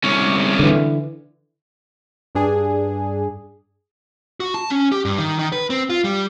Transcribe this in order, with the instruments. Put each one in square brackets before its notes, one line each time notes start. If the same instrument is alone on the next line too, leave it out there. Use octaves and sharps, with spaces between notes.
[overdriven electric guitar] C2 C#4
[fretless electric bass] D3 E3
[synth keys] G2 D4 G#4
[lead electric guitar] F#4
A5
C#4
G4
G2
D#3
D#3
B4
C4
F4
G3